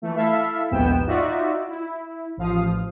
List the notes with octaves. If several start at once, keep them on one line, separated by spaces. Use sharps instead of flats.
E3 A3
E4 A4 E5 F5
A#1 D#2 G#2 B3 G5 E7
D#4 F4 F#4 D5 E5
E4
A1 F3 F5 D#6